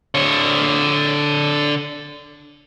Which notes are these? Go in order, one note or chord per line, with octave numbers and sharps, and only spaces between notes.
D3 C#5